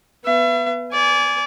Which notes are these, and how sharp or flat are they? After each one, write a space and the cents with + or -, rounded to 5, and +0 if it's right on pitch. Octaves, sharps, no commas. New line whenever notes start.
B3 +0 E5 +40
D5 -25 G#5 +0